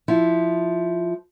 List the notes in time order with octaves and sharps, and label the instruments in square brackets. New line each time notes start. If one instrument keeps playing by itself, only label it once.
[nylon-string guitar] F3 E4